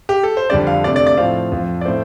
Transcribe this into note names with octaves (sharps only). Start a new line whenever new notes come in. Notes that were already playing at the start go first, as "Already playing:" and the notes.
G4
A4
C5
F2 D3 G3 C4 D5
F5
C3 A3 D4 D5
D5
D5
A2 F3 C4 F5
F2 F3 C4
D5
A2 A3 C4 C5